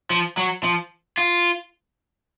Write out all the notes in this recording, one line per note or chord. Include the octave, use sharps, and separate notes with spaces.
F3
F#3
F3
F4